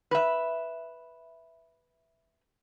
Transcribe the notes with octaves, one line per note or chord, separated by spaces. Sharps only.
B4 E5